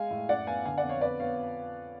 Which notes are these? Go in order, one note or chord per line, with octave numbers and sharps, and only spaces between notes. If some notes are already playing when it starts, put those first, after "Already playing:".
Already playing: G#3 F5 G#5
A2
F#2 D5 F#5
B3 F5 G#5
D3 F5 G#5
D5 F#5
F2
C#5 F5
B3 B4 D5
B3 C#5 F5